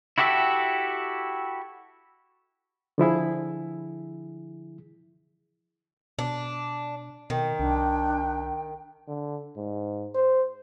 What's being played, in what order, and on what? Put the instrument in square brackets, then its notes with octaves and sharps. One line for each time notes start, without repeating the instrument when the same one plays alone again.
[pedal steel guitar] E4 F#4 G4 A4 E5
[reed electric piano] D3 F3 E4 G#4
[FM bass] B2 [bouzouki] D4
[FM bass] B2 [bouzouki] D#3 [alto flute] G5
[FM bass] C2 [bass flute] D4
[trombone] D3
G#2
C5